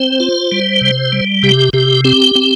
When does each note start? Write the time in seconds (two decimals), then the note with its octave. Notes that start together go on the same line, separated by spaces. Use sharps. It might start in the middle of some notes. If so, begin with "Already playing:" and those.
Already playing: C4 C5
0.20 F4
0.52 G3
0.81 C3
1.12 G3
1.43 C3 G4
1.73 C3 G4
2.04 C4 G4
2.35 C4